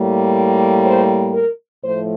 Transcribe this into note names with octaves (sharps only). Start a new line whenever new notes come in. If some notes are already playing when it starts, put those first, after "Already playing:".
Already playing: A2 G3 A#3
C5
A#4
A2 F3 A3 C5